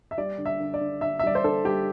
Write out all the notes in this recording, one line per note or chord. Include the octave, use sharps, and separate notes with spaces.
E5
G3 D5
D3
E5
D3
D5
D3
D3 E5
E5
G3 D5
C5
D3 A4
G3 G4